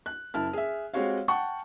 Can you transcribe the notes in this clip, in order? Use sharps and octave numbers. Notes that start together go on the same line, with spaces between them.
F#6
F#1 E4 A5 F6
G#4 E5
G#3 C4 F#4 G4 C#5 F5
F#5 G5 A5 C#6